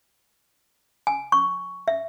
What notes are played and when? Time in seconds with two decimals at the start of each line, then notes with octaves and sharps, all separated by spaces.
1.07 G#5
1.32 C#6
1.88 E5